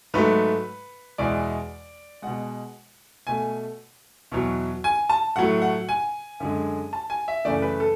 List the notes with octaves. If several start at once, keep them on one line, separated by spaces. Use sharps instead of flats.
G#2 F#3 A3 B4
E2 B2 G#3 D5
B2 G#3 F#5
B2 A3 G#5
E2 B2 F#3
G#5
A5
A2 F#3 A3 F#5
F#5
G#5
F#2 D3 G#3
A5
G#5
E5
F#2 C#3 E3 A3 D5
B4
A4